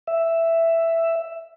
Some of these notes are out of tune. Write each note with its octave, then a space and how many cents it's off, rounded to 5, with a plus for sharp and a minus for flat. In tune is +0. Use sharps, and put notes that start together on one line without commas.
E5 +5